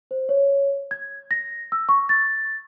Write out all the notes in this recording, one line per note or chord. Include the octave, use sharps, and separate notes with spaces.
C5
C#5
G#6
A#6
E6
C#6
A6